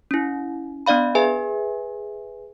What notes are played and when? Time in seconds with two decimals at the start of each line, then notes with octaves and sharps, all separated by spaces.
0.11 C#4 E4
0.86 B3 D4 D5 F5 B5
1.15 G#4 B4 E5 G#5